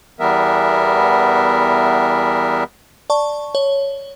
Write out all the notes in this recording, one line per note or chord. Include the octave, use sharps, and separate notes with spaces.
E2 E3 G3 B3 A#4 E5
D5 A5 C#6
C#5